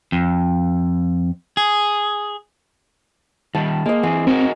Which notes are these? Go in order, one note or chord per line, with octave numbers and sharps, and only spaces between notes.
F2
G#4
D#3 G3 A5
G#3 A#3 D#5
E3 C4 G#5
C4 D#4 F#4 A#4